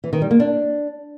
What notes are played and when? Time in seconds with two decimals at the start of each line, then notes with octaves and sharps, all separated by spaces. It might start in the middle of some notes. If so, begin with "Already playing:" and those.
0.04 E3
0.13 D#3
0.22 G3
0.31 A#3
0.40 D4